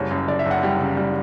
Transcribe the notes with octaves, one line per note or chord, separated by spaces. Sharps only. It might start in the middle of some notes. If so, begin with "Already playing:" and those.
Already playing: F#1 G3 C#5
F#2
F#1 D5
E5
F#1
F#5
G3 G5
C#3
G3